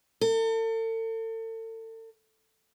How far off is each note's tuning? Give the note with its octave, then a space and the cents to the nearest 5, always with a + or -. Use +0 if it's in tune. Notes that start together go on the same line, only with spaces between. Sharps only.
A4 +40